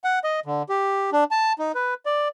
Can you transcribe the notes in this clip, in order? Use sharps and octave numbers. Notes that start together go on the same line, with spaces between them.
F#5
D#5
D3
G4
D4
A5
D#4
B4
D5